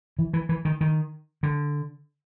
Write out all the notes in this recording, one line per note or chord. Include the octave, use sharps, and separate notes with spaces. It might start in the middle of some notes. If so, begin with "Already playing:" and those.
E3
E3
E3
D#3
D#3
D3